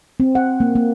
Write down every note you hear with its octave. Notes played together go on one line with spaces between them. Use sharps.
C4
F#5
A#3
A#3